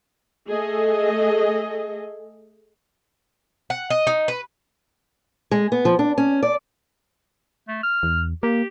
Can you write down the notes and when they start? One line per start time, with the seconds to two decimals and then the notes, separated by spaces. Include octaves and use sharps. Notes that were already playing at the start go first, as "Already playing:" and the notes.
0.49 A3 G#4 A4 D#5
3.70 F#5
3.90 D#5
4.07 D#4
4.28 B4
5.51 G#3
5.72 B3
5.85 F3
5.99 D4
6.18 C#4
6.43 D5
7.68 A3
7.83 F6
8.03 E2
8.43 A#3 G4